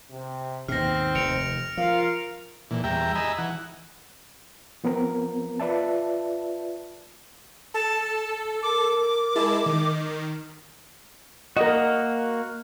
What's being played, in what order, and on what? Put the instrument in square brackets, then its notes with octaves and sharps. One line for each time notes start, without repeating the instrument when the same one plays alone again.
[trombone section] C3
[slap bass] D#2 G#2 B2 [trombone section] C4 [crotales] F6 A#6
[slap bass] F1 D#2 [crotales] C#7 D7 F7
[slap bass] F3 [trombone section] F4 A#4 [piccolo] F5
[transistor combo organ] A#2 E3
E2 G3 E5 G5 A#5
D#5 G#5 A#5 B5 E6
E3 F#5
[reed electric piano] F3 B3 C4 A#4
F4 B4 D5 E5 A5
[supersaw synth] A4 [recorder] A5
[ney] A#4 [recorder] D6
[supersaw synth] G#3 E4 A5
D#3
[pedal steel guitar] A#3 F#4 [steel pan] A#4 D#5